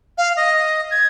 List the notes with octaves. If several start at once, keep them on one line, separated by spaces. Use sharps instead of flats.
F5
D#5
G#6